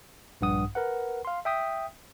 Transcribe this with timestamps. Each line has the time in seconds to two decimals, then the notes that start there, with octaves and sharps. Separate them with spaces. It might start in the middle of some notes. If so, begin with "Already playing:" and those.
0.41 A#1 G2 F#5 D#6
0.75 A#4 B4 F#5
1.25 F5 C6
1.45 E5 G5 D#6 B6